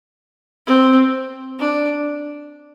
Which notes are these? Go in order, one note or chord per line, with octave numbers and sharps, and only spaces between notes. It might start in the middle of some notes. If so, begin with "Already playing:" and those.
C4
D4